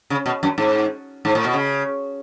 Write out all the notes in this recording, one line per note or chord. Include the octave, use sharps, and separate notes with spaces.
C#3
B2
F#2
G#2
G#2
A2
B2
C#3